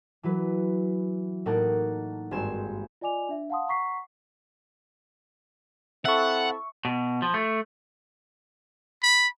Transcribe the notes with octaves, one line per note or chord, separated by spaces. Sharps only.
E3 F#3 B4
A2 A#3 D#4 A#4 F#5 A5
G#1 G2 G#3 C5 G#5 E7
F4 D5 D#5 G#5 D6 F7
D4 E5
F5 F#5 A5 C6 D#6
F#5 A#5 C#6 B6 C7
C4 E4 A4 E5 F#5 C#6
B2
F3
A3
B5